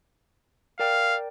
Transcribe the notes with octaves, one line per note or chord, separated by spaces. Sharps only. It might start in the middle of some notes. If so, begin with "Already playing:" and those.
A#4 D5 F5 G5